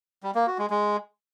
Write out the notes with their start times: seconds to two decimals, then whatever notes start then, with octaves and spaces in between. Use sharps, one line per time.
0.23 G3
0.35 A#3
0.47 F#4
0.59 G#3
0.70 G#3